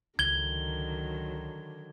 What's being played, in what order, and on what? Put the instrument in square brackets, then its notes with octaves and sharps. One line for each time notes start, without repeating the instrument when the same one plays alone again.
[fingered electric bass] C#2 [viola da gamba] D3 D#3 F#3 [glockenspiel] G#6 G7